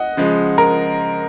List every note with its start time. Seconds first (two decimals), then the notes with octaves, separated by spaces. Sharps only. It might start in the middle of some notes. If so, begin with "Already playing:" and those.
Already playing: D#5 F#5
0.17 C#3 F3 G#3
0.58 A#4